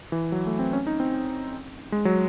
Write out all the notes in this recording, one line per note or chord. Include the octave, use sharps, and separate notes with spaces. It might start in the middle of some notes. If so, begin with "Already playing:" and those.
E3
F#3
A3
C4
C#4
D#4
C4
G#3
F#3